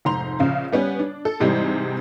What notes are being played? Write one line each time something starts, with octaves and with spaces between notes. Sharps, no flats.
F1 G#2 A#5 C6 F7
A#1 C#3 F5
G3 B3 C#4
D4
A4
G#2 C3 E3 G3 G#3